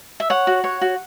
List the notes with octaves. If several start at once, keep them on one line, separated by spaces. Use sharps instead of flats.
E5
C#5 F#5
F#4
C#5
F#4